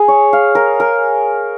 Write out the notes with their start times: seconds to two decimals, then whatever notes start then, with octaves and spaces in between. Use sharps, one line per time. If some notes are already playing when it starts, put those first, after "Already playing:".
Already playing: G#4
0.08 C#5
0.33 F5
0.55 A#4
0.80 A#4